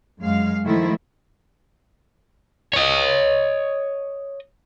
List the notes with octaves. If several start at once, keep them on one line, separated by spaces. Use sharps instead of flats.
F#2 G#3 F5
D#3 F3 A3 E4
C#5 D#5